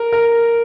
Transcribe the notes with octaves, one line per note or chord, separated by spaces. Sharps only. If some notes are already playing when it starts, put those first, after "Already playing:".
Already playing: A#4
A#4